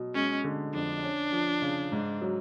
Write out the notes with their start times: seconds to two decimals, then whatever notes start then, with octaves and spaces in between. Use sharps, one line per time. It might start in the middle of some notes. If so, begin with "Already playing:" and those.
Already playing: B2 F#3
0.15 G#3 C#4
0.44 D3
0.74 F2 D4
1.03 C#4
1.33 F3
1.62 C#3
1.92 G#2
2.22 F#3